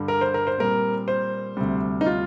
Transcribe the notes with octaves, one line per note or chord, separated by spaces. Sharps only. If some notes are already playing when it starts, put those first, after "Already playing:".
Already playing: G2 D3 G3
A#4
C5
A#4
C5
A#2 G3 C4 A#4
C5
D2 C3 G3
D#4
F4